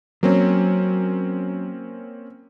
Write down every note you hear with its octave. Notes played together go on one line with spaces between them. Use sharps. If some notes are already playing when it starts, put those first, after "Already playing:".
F#3 A#3 C4 C#4